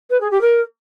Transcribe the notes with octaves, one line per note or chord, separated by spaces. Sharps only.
B4
G#4
G4
A#4